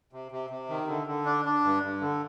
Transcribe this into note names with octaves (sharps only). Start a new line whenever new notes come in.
C3
C3
C3
D#3
D3
D3
D4
D4
G2
G2
D3